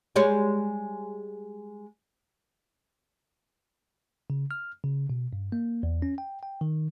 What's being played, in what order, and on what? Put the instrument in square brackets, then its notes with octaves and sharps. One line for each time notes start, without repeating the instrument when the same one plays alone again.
[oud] G3 G#3 C#5
[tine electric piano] C#3
F6
C#3
B2
G2
A#3
E2
C#4
G5
G5
D#3